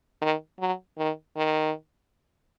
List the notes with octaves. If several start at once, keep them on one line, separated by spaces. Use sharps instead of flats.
D#3
F#3
D#3
D#3